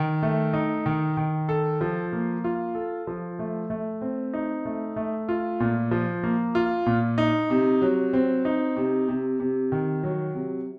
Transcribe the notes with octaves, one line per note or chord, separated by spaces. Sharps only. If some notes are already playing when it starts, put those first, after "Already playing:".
Already playing: D#3
A3
D#4
D#3
D#3
A4
F3
A#3
F4
A4
F3
A3
A3
C4
D#4
A3
A3
F4
A#2
F3
A#3
F4
A#2
D#4
C3
F#3
C4
D#4
C3
C3
C3
D#3
F#3
C3